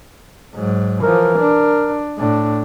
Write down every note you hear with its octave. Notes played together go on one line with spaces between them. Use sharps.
G#2 F#3
E3 F3 A#4
D4
A2 D4